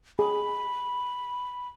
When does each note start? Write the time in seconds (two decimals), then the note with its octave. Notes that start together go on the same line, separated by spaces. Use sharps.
0.19 G#4 B5